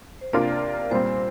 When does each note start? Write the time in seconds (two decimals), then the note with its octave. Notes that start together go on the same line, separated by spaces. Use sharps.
0.21 C5
0.33 C3 A#3 D4 F4 D5
0.91 A#2 G3 C4 C5